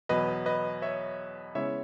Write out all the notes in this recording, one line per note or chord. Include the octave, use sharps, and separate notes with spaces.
E2 B2 F#3 B4 D#5
B4 D#5
C#5 E5
C#3 G#3 B3 E4 C#5 E5